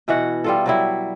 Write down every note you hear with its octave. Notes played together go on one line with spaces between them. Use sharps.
B2 E3 F#4 F#5
G3 F4 A4
F#3 G3 E4